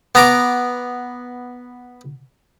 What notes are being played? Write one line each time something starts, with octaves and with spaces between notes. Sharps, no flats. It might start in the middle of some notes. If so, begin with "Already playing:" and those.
B3 A#5 D6